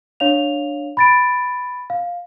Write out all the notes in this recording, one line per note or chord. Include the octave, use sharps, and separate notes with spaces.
D4 C#5 F5 F7
B5 A6 D7
F5